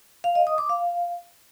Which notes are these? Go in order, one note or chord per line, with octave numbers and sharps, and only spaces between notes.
F5
D#5
D#6
D6
F5